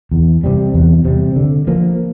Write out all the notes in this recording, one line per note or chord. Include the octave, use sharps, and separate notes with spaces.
E2
C3 G3
E2
C3 G3
D3
F3 A#3